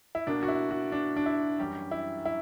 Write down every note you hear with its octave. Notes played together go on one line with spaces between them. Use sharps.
E4
B2 A#3 D4
F#4
E4
F#4
D4
D4
E4
F#2 E3 G3 G4
E4
E4